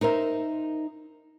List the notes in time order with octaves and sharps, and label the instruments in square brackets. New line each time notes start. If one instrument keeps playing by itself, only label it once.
[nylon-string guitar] D#4 A#4 C5 E5